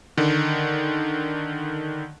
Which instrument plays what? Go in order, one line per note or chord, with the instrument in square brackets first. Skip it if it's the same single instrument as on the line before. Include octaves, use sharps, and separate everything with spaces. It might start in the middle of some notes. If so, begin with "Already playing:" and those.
[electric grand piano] D3 D#3